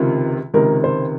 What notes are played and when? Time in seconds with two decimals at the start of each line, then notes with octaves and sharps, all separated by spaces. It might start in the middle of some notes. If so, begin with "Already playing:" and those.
Already playing: C#2 C3 D#3 F4
0.54 C#2 C3 D#3 A#4
0.84 C5